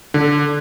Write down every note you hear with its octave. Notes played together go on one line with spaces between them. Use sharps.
D3